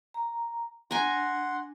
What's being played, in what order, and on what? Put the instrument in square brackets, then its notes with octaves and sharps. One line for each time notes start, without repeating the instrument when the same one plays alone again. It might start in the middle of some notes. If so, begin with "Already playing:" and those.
[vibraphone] A#5
[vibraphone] D4 [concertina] F#5 C6 [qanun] G#5 A#5